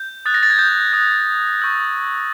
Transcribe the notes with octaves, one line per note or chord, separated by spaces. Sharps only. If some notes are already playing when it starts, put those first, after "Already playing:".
Already playing: G6
D#6 F#6 A6
A#6
A6
G#6
G6
D#6 F#6
C#6 E6 G6